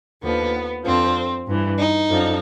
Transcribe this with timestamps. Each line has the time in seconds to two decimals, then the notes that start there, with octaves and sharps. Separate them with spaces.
0.22 D#2 D3 F3 B3
0.84 F2 D3 F3 C4
1.46 G2 E3
1.78 D#4
2.09 F#2 D3 F3